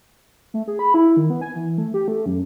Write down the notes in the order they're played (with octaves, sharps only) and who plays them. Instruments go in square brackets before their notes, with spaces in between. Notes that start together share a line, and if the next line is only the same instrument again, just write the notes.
[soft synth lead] A3
G#4
B5
E4
D#3
B3
G#5
E3
A3
G4
A3
F#2